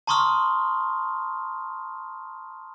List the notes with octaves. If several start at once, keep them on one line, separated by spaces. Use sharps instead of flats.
A5 A#5 C6 C#6 D#6 F6